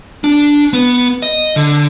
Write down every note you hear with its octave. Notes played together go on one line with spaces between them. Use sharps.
D4
B3
D#5
D3